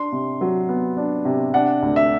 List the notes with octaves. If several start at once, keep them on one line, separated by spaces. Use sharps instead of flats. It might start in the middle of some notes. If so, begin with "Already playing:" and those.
Already playing: D4 C6
C3
F#3
B3
D4
C3
D4 F#5
D2
E5